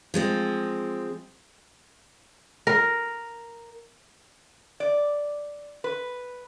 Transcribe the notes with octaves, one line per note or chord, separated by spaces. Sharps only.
F3 G#3 C4
A#4
D5
B4